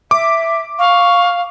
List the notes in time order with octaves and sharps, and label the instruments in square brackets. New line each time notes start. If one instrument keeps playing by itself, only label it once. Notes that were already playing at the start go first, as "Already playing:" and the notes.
[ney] E5 [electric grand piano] D6
[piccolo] F5 [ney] C#6